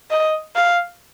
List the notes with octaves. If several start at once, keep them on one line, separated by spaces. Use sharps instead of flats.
D#5
F5